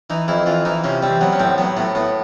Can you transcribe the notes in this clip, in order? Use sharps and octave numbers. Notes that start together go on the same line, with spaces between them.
E3 D#4
F2 E4
E3 F4
E3 D#4
C3 C#4
G3 C4
F#3 B3
C#4
A2 C4
F#3 B3
A2 B3
A2 B3